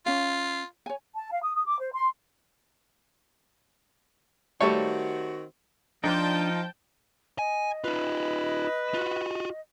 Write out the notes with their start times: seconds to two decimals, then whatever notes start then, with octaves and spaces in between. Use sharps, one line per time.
0.06 C#4 F4 F5
0.86 C#5 G#5
1.15 A5
1.30 F5
1.42 D#6
1.54 D#6
1.66 D6
1.79 C5
1.92 C6
4.60 D#3 G3 A3 C4 F#4 C#5
6.04 F3 D4 D#4 F4 G5 A5
7.39 D#5 G#5
7.84 D#4 F4 B4
8.94 F4 F#4